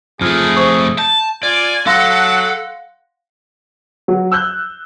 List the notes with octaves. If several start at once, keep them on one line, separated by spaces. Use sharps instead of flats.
F2 A3 F4 G#4 F6
C5 C#6 D#6
A5 G6
F4 D5 G#5
F#3 A4 F5 F#5 C6 A#6
F#3
E6 F#6 G6